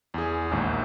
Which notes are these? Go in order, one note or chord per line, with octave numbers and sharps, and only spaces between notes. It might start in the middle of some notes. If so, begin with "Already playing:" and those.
E2 G#4
A#1 D#2 G#2